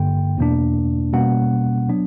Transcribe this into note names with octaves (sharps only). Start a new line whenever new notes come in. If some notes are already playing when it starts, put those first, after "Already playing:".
Already playing: G2 D3 A#3 G5
E2 B2 A#3 D4
B2 G3 A#3 C#4 F#5
F#3 B3 D4